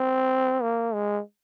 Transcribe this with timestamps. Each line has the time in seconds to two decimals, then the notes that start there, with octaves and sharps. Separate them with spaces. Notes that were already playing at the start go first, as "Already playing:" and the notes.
Already playing: C4
0.62 A#3
0.94 G#3